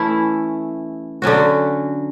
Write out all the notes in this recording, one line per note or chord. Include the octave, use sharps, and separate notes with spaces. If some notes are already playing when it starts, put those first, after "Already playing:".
Already playing: E3 A3 C#4 E4
D3 F#3 C#4 F#4